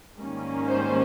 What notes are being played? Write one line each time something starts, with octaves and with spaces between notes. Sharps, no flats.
G#2 D#3 G3 A#3 C#4
C5